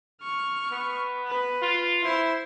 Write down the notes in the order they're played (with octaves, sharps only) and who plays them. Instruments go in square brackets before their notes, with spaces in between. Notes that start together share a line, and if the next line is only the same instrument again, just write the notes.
[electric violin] C#6 F6
[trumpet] B3
[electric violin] B4
[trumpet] F4
[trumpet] E4 [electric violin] C5 C6